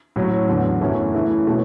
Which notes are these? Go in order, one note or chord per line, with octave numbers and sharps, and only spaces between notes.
A2 F#3 C#4
E2 D3 F#3
F#2 E3 A3 C#4 E4
C#3 E3 A3 C#4 E4
B2 A3 C#4